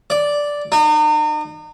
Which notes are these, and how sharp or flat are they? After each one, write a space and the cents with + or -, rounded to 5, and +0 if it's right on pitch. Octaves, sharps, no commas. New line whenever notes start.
D5 -5
D#4 -40